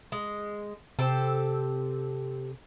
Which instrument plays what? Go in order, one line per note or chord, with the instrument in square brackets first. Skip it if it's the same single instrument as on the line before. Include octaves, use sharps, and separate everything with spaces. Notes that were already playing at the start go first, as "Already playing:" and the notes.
[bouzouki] G#3
[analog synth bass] C3 [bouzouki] C4 G4 A4